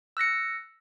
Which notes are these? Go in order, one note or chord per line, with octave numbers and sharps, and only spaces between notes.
E6 F#6 A#6 C#7